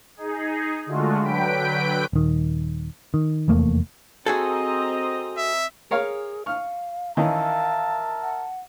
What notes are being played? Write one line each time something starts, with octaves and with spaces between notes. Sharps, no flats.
D#4 G#4
D3 G#3 A3 F4 F#4
D3 F#3 B4 G5 B6 D7
D#1 D#3
D#3
F1 E2 A3 A#3
C4 F#4 G#4 A4 D#5 A#5
E5
G#4 A#4 C#5 F5
F5 C#6 F6
D#3 E3 C#4 A#4 E5 F5 A5
F#5